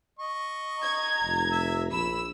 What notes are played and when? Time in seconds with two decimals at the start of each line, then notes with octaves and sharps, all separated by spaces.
0.19 D#5 C#6
0.82 A#5 G#6
1.23 F1
1.52 E5
1.92 A#1 B5 E6